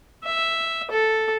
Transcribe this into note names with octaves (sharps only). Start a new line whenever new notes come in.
E5
A4